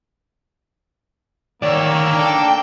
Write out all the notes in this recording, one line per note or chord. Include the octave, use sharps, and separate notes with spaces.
D2 D#3 A#3 C#5 D5 E6
D4 A4 G5